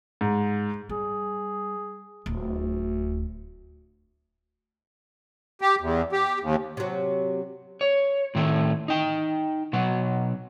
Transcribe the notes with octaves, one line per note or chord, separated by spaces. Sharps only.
G#2
G3 G#4
D1 D2
G4
E2
G4
D#2
C3 F#3
C#5
A2 D#3 A3
D#4 G5
B2 F#3 B3